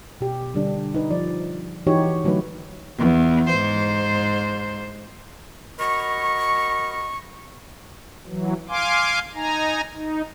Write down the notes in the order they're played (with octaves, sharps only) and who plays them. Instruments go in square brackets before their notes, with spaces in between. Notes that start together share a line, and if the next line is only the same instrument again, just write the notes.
[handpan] B2 G4
D3 G3 D4
D#4 B4
F3 D5
E3 D#4 F#4 G4 C#5
D3 F#3 A3 D#4 B4
[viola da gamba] E2
G#2 C5
[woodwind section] F#4 A#4 D#5 A#5 B5 C#6
[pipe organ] E3 F#3
F5 G#5 C6 D6
D#4 G#5 A#5
D#4